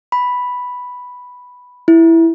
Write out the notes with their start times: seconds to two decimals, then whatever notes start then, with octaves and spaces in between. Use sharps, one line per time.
0.12 B5
1.88 E4